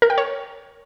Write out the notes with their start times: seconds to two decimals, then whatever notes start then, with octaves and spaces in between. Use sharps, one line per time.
0.02 A#4
0.10 G5
0.18 C#5